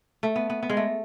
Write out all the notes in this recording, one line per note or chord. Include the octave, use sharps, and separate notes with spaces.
A3
B3
B3
B3
G#3
A3